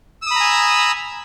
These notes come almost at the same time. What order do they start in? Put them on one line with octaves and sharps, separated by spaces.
E6 D#6 B5 A#5 G#5